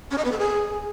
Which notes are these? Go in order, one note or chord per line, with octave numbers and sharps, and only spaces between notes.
C#4
D#5
B3
A4
G#4